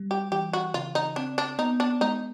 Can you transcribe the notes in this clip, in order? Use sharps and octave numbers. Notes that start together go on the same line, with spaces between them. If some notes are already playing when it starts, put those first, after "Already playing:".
Already playing: G3
G4
E3 G4
F#4
C#3 F4
D#4
C4 D4
D4
B3 D#4
D4
G#3 D#4